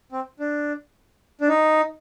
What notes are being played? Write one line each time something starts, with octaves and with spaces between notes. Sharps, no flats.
C4
D4
D4
D#4